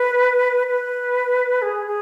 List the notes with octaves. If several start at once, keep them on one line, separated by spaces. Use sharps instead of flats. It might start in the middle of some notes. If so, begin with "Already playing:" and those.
Already playing: B4
B4
G#4
G#4